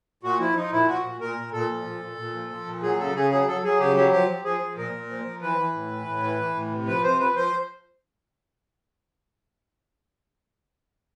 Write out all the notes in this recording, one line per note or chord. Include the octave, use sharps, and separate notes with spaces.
A#2 F#4
F3 E4
F3 D#4
A#2 E4
F3 F#4
A#2
A#2 A#4
A#2
A#2 A4
F3
A#2
A#2
A#2
F3
F3
A#2
F#3 G#4
C#3 A4
C#3 G#4
F#3 G#4
F#3 A4
F#3 G#4
C#3 G4
F#3 G4
F3 G4
F3
F3 G#4
F3
A#2 A#4
A#2
F3
F3
E3 B4
E3
A2
E3
A2
E3
E3
A2
C3
F3 B4
C3 C5
F3 B4
F3 C5